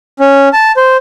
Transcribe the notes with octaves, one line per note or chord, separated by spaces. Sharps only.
C#4
A5
C5